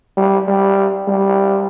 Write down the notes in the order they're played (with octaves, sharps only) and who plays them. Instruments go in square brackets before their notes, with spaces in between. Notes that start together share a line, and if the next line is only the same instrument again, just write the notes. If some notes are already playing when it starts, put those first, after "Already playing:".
[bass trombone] G3
G3
G3